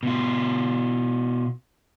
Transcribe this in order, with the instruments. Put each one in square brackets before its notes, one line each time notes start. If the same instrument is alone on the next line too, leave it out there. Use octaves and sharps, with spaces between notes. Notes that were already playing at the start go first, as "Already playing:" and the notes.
[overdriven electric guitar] B2 F4